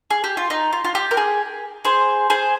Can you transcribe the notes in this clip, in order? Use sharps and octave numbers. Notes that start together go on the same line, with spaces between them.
G#4
G4
F4
D#4
F4
F4
G4
A#4
G#4
G#4 C5
G#4 C5